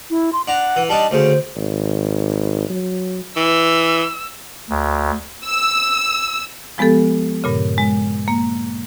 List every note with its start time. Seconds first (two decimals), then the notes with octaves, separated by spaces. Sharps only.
0.10 E4
0.33 C6
0.48 D4 F#5 A#5
0.76 E3
0.89 G3 D4 D#4 A5
1.11 D2 C#3 C5
1.56 G#1
2.69 F#3
3.37 E3 E6
4.70 D2
5.45 E6
6.78 F3 G#3 B3 G4 A4
7.44 G2 A#2 C#3
7.78 G#3
8.28 A#3